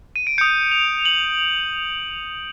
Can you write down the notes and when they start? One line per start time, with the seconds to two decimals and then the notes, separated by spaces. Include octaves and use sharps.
0.16 D#7
0.27 D7
0.38 D#6 G6 C#7
0.72 F7
1.05 F#7